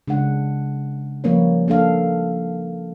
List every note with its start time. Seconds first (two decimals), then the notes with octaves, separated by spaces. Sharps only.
0.07 C#3 G#3 D4 F#5
1.24 F3 G3 A#3 C#4 B4 C#5
1.68 A#3 D4 A4 F5